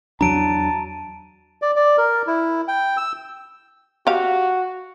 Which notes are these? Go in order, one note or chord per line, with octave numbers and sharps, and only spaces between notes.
E2 F#3 D4 A5 A#5 D7 D#7
D5
D5
A#4
E4
G5
E6
F#4 G4 F5